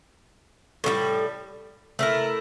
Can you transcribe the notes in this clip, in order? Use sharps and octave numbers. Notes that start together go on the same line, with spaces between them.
A2 E3 G3
A3 E4 A#4